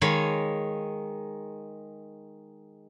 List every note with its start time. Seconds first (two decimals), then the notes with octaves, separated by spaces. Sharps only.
0.01 D#3 G#3 C#5 F5 B5